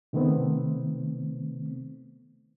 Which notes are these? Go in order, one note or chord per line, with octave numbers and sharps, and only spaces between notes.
C3 D#3 A3 B3 C4